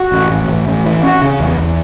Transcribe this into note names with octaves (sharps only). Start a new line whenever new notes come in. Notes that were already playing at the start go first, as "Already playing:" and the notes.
Already playing: F#4
A1
A1
A1
A1
E3
C#4 F#4
C#3
E2
E2